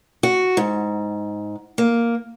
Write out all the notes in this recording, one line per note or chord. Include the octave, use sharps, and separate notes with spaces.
F#4
G#2
A#3